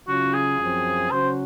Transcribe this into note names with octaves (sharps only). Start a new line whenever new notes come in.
C#3 F#3 C#4 F4 F#4
G#4
F#2 F3 C4
C#3 F#3 C#4 F#4 C5